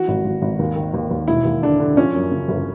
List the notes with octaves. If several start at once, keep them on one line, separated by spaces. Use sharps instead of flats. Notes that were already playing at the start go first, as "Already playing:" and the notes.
Already playing: E3 F#4
G#1
G#1
G#1
D#2
D#3
D#2
D#2
E1 E4
D#2
D3 D4
D3
F3 C#4
F#2
C#3
G1